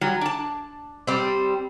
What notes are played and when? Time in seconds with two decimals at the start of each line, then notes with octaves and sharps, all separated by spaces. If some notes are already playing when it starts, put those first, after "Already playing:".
0.01 F#3 G3
0.21 D4 A5
1.07 G3 C4